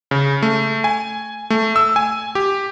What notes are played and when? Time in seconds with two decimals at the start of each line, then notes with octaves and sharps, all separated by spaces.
0.11 C#3
0.42 A3
0.84 G#5
1.50 A3
1.76 E6
1.96 G#5
2.35 G4